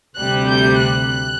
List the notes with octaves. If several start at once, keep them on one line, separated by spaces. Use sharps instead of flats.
D2 C3 G3 F#6
G6
F#6